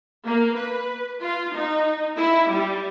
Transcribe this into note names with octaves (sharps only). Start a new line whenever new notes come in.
A#3
B4
F4
D#4
E4
G3